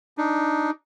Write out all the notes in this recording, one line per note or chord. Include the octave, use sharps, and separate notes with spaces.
D4 D#4